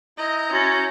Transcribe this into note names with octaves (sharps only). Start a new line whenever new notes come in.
E4 D#5 A#5 G6
C#4 F#4 A6 A#6